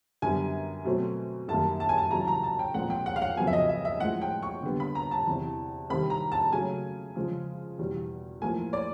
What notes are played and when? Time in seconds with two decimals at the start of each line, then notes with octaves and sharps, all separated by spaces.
0.22 F#2 D3 G3 B3 G#5
0.85 B2 F#3 A3 C4
1.48 F#2 D#3 G3 A#3 A5
1.80 A5
1.89 G#5
1.98 A5
2.11 E2 C#3 F#3 A#5
2.20 A5
2.28 A#5
2.43 A5
2.59 G5
2.74 A#2 F3 G#3 C4 F#5
2.90 G5
3.06 F#5
3.16 F5
3.22 F#5
3.37 F2 C#3 F#3 B3 G#5
3.47 E5
3.53 D#5
3.69 E5
3.85 E5
4.00 A2 F3 G#3 F#5
4.21 G5
4.43 C#6
4.63 D3 G3 B3
4.80 B5
4.95 A#5
5.11 A5
5.27 E2 C3 E3
5.90 C3 D#3 G3 C4 B5
6.10 A#5
6.32 A5
6.52 C#3 F#3 A3 C#4 G#5
7.16 C#3 F3 G#3
7.78 E2 B2 G3
8.42 A2 F3 A#3 G#5
8.73 D5